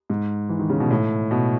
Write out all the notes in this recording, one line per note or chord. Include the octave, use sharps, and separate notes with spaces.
G#2
E3
D#3
C#3
B2
A2
B2